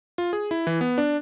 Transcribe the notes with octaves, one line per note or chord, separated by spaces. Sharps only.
F4
G#4
E4
E3
B3
D4